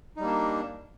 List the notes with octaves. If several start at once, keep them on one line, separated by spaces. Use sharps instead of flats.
G3 A#3 D4 D#4